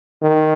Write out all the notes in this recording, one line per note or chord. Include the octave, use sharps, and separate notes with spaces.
D#3